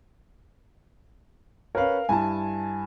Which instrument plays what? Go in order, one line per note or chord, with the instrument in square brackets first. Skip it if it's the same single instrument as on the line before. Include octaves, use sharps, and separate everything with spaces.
[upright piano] C#4 B4 C#5 [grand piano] A#4 F5
[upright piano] G2 E4 A5 [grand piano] G#5